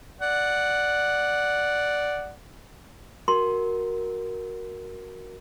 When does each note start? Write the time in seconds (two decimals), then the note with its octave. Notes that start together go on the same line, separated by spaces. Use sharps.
0.21 D5 F#5
3.28 F#4 A#4 C6